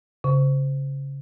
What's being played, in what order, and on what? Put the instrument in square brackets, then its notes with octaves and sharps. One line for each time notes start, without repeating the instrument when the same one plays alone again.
[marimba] C#3